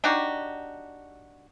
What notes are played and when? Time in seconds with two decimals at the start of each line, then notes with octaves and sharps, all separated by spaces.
0.04 D4 D#4 F#4 G4